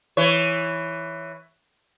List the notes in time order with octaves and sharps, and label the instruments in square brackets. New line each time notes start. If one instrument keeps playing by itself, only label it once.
[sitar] E3 C#5